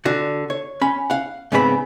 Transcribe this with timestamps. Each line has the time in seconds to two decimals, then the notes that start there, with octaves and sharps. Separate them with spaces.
0.05 D3 F#4
0.50 C#5
0.82 C#4 B5
1.10 F5 F#5
1.52 G#2 C#3 B3 C4 C5 B5